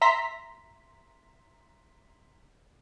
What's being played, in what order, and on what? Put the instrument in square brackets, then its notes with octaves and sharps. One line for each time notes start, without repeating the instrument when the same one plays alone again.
[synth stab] E5 A#5 C6 B6